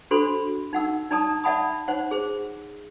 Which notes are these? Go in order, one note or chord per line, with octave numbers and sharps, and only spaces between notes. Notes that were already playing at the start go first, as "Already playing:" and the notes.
D4 F#4 A4 C5 B5 C6
D#4 F#5 E6
D#4 D5 A5 A#5 D#6
D5 E5 F#5 A5 B5 D#6
D#4 C5 C#5 F#5
G#4 C5